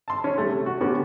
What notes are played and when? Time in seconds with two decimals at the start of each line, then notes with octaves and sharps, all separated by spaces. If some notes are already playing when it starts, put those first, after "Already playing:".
0.08 A5 C6
0.24 C#4 C#5
0.38 G3 A3
0.50 C3
0.66 F#4
0.81 D3 B3 C#4 F#4 G4